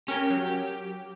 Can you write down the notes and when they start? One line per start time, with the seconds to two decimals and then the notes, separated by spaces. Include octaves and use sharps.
0.08 C#4 G4 A#4
0.30 F#3